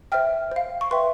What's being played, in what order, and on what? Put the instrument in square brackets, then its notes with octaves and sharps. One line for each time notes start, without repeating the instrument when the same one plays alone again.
[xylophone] C5 E5 G5 F6
C5 F5
C#6
B4 E5 G5 C6